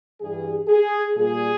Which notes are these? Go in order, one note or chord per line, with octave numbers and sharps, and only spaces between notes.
G2 E3 G3 G#4
G#4
A#2 G3 G#4